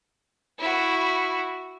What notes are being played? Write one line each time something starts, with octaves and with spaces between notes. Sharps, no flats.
E4 F#4